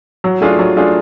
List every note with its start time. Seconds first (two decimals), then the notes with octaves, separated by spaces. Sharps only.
0.24 F#3
0.41 A3 D4 F4 G#4
0.59 F#3
0.77 A3 D4 F4 G#4